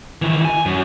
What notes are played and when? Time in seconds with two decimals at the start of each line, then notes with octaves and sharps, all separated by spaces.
0.22 D#3 E3
0.45 G#5
0.66 F#2